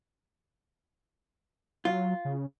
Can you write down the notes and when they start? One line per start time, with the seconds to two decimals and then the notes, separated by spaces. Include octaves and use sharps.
1.85 F#3 F4
2.25 C#3